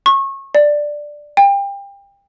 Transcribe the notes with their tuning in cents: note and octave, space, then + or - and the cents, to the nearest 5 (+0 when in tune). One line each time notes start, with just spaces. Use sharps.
C#6 -25
D5 +5
G5 +30